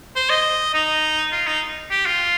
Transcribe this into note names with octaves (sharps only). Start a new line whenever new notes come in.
C5
D#5
D#4
F4
D#4
G4
F4